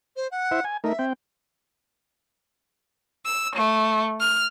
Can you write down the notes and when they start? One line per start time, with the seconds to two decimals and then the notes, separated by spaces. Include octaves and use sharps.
0.16 C5
0.31 F#5
0.51 E4 C5 E5
0.64 G#5
0.84 A3 D#4 A#4 E5
0.99 C4 G5
3.25 E6
3.55 A3
4.20 F6